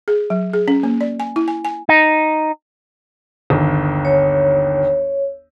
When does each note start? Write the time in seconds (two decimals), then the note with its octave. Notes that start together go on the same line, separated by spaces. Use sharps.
0.08 G#4
0.30 F#3
0.53 G#4
0.68 C#4
0.83 A#3
1.01 D5
1.20 G#5
1.36 E4
1.48 G#5
1.65 G#5
1.89 D#4
3.50 G1 D#2
4.05 C#5